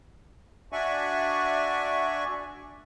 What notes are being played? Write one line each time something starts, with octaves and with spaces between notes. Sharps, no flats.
D4 F#4 D5 E5 G#5 C#6